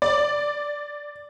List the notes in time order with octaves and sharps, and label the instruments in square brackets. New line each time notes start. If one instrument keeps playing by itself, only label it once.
[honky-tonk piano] D5